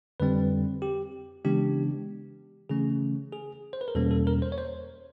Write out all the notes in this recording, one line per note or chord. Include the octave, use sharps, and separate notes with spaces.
F2 D3 G3 C4 B4
G4
C#3 E3 G#3 B3 D4 G4
C#3 E3 A3 C#4 G#4
G#4
C5
B4
A#4
E2 B2 G3 A#3 C#4 A4
A4
A#4
C5
C#5
C5